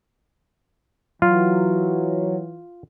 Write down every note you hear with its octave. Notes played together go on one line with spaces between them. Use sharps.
E3 F#3 F4